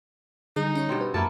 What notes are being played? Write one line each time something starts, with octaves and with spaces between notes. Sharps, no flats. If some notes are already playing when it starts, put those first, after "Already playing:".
D3 G3 D#4 G#4
C#4 C#5
G2 B2 C4
B4
F#2 F#3 A#3 E4 A5